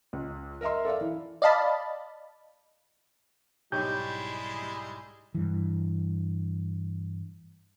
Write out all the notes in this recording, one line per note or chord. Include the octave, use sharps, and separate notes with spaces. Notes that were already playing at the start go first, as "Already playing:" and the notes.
C#2
A#4 D#5 E5 A#5 C6
A4 D5 E5 F5
E3
D5 D#5 F5 A5 B5
B1 G#2 G3 G#3 E4 G4 C#5 G6
G2 E3